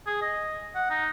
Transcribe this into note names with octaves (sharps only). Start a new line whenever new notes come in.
G#4
D#5
F#5
D#4